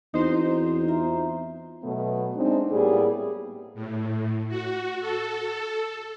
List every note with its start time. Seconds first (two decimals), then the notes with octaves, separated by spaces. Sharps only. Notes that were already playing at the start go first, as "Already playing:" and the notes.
0.14 E2 C4 D#4 F#4 C5
0.88 F4 E5 A#5
1.83 B2 F#3 A3 B3
2.36 G#3 C4 D4 D#4
2.72 A2 G3 A#3 B3 G#4
3.75 A2
4.48 F#4
5.00 A4